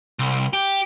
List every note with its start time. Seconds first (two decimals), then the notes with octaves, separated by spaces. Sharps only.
0.19 C2
0.53 G4